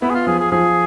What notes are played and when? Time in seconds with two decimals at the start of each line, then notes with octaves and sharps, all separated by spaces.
0.02 B3 E4
0.10 G#4
0.14 F4
0.27 F3 G#4
0.39 G#4
0.52 F3 G#4